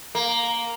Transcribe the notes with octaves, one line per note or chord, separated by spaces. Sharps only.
A#3